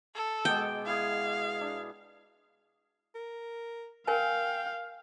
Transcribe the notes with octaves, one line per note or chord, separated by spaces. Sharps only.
A4
B2 G#3 G5 D6
E4 G#4 F5
D4
A#4
A#4 F5 G5 G#5